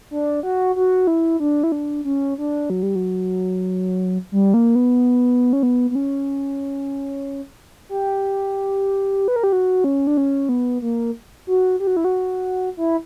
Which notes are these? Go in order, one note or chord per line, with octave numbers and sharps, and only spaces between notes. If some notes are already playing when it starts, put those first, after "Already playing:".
D4
F#4
F#4
E4
D4
E4
D4
C#4
D4
F#3
G3
F#3
G3
A#3
B3
C#4
B3
B3
C#4
G4
B4
A#4
G4
F#4
C#4
D4
C#4
B3
A#3
F#4
G4
F#4
E4
F#4
E4